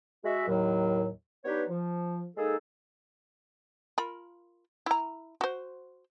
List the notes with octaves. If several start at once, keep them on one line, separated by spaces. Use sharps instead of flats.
G#3 F#4 E5
D#2 A2 F#3
B3 D4 D#4 G4 B4 C#5
F3
G#3 A#3 D#4 G#4 A4
F4 A#4 B5
E4 A#5
F#4 C5